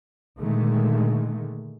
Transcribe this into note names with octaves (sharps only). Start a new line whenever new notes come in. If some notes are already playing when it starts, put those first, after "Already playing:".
A#2 D3 D#3 G#3 A3